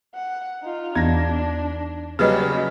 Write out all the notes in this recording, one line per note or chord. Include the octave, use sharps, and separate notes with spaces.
F#5
D#4 F4
E2 D4 D#4 G#6 A#6
C#3 F#3 G3 B3 C#4 G#4 B4 D#5